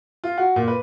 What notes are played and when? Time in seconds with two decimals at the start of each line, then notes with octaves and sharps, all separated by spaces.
0.24 F4
0.38 F#4
0.56 A#2
0.68 B4